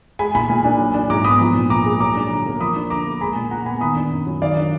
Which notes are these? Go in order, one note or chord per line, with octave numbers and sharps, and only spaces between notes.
G#3 G#5 B5
A#2 G#5 B5
A#2
D4
F#3
D4
G#2 A#5 D6
B3 B5 D#6
F3
A#2
A#2 A#5 D6
G#3
F#3 A#5 D6
D4
D3
A#3
F3 B5 D#6
D4
D3 A#5 D6
A#3
G#3 G#5 B5
A#2
A#2 F#5 A#5
B3 G#5 B5
D#3 B5 D#6
D4
F#2
F#3
D#3 D5 F5
D4